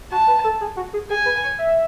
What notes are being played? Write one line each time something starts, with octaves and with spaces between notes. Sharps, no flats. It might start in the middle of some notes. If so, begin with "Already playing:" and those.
F#4 A5
B4
A4
G#4
F#4
G#4
G#4 G#5
B4
C#5
E5